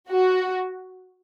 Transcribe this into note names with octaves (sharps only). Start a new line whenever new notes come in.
F#4